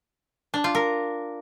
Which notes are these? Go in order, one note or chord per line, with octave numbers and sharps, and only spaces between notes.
D4
F4
A#4